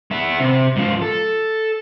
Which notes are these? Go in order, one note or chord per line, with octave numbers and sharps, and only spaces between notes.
B3 E5
C3
G#2 F3
A4